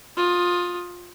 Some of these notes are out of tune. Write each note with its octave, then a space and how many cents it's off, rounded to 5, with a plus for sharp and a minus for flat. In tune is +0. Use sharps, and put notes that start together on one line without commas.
F4 +20 D#6 +0